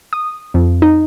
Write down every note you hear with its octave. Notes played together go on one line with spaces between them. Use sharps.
D#6
F2
D#4